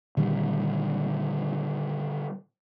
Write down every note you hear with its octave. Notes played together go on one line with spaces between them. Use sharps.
A#2 D3 D#3 G3